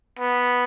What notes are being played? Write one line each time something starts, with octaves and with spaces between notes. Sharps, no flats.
B3